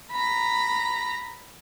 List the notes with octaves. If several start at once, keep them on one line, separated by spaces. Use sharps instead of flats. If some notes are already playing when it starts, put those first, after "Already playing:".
A#5 B5